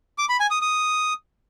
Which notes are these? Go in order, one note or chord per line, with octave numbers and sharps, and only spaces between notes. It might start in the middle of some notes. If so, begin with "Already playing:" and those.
D6
B5
G#5
D#6
D#6